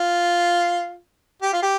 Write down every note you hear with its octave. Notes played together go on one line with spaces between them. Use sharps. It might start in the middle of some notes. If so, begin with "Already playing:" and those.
Already playing: F4
G4
F4
G4